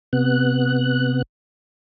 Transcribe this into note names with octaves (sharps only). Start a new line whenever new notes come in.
C3 B3 F#6